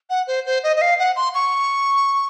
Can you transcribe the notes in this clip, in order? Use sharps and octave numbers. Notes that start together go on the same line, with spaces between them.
F#5
C5
C5
D#5
D#5
F5
F#5
C6
C#6